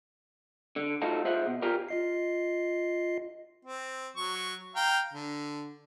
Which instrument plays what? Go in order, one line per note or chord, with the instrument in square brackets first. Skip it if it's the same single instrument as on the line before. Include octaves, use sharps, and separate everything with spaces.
[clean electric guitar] D3
A3 D#4 F4 F#4 A4
F4 G#4 C5 D#5 E5 F#5
B2
F4 G4 G#4 A#4 D5
[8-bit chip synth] F4 D#5 C7
[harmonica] C4
F#3 C#6
F5 G5 A#5
D3